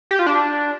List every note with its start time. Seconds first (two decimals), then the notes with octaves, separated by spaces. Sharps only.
0.11 G4
0.19 F4
0.26 D4